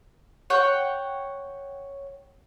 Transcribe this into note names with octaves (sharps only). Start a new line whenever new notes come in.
C#5 F#5 G5